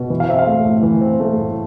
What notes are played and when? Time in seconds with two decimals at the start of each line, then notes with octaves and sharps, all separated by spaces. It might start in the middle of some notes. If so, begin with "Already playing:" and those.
Already playing: B2
0.10 E3
0.20 F5
0.29 C4 E5
0.39 F5
0.47 A3
0.65 A2
0.83 E3
1.01 C4
1.20 A3
1.38 A2